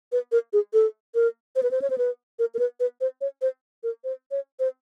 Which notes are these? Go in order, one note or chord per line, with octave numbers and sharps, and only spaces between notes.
B4
A#4
G#4
A4
A#4
C5
B4
C5
C#5
C5
B4
A#4
A#4
B4
B4
C5
C#5
C5
A#4
C5
C#5
C5